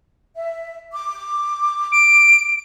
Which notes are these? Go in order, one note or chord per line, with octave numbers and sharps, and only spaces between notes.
E5
D6
D7